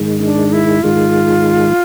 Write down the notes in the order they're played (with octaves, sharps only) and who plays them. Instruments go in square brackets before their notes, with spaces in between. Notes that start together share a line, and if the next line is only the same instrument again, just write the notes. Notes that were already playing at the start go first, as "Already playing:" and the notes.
Already playing: [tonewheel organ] G#2 D#3 G#3
[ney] C#4
D4
E4
[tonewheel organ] G#2 D#3 G#3 [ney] F4